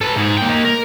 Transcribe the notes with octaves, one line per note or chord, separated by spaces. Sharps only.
A4 B4
G#2 G#4
A#3 G5
A#3 D#4
A#4